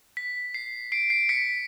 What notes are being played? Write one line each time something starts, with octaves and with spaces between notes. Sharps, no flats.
B6
C7
C7 D7
C7 D7
B6 C#7